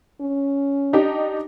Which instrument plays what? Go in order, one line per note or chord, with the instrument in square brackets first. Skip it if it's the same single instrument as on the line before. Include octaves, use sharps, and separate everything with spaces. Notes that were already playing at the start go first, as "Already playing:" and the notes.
[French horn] C#4
[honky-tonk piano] D4 D#4 G4